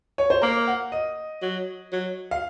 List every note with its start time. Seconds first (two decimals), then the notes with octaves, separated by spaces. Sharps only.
0.18 C#5
0.30 C5
0.42 A#3 A#4
0.67 F#5
0.92 D#5
1.42 F#3
1.93 F#3
2.31 F5